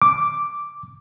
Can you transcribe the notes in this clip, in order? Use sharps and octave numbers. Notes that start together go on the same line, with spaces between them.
D6